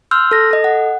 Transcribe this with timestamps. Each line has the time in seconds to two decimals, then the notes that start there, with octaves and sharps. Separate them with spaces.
0.11 C6 E6 F6 G6
0.31 A4 A#6
0.51 A4 D#5
0.64 F#5